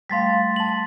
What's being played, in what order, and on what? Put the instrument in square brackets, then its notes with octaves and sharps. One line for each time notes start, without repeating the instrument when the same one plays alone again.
[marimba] G3 A3 F5 [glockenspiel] C6 A6 B6
[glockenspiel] A5 F#7